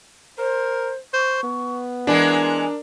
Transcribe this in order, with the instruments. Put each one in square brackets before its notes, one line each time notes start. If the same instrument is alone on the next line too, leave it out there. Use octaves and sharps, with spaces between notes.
[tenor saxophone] A#4 [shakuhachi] C5
[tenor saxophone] C5 [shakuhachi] C#6
[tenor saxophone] B3
[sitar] E3 G#3 [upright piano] D4 [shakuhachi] A#4